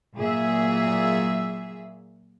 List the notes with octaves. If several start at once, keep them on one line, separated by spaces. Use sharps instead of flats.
A#2 F#3 G#4 E5